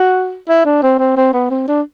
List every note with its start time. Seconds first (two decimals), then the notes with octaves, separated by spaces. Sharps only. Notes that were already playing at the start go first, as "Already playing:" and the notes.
Already playing: F#4
0.49 E4
0.65 D4
0.82 C4
0.99 C4
1.17 C4
1.33 B3
1.50 C4
1.68 D4